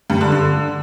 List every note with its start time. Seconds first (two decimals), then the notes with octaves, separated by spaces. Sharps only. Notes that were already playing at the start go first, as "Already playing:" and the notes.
0.10 G2
0.21 D3
0.32 D3